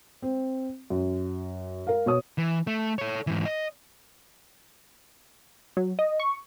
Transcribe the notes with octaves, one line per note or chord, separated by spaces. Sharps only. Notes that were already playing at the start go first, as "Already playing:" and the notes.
C4
F#2
A#4 F5
B2 C#5 D#6
E3
A3
A4 C#5
G#2 E3
D#5
F#3
D#5
C#6